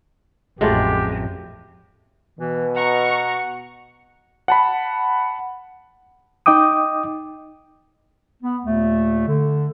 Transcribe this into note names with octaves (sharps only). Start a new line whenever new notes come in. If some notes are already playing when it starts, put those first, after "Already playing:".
A1 F2 F#3 G#3 A3 F4 G4
B2 E3
F#5 A#5 C#6
F#5 A5 B5
D#4 D#5 G5 D6 D#6
B3
D#2 A#2 A3
D3